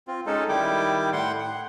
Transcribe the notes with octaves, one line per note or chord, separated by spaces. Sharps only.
C4 F4
G#3 C#4 D#4 A4
D#3 G3 E4 G5 D6
A2 F#5 G5 C6
F#5